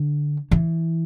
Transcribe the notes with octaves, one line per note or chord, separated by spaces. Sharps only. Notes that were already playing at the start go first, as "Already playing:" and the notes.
Already playing: D3
E3